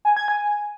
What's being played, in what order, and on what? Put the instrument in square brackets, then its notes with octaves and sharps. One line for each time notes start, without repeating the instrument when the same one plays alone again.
[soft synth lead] G#5
G#6
G#5